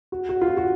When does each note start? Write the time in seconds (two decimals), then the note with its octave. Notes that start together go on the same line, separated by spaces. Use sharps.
0.12 F#4
0.29 F#4
0.41 F4
0.46 F#4
0.57 F#4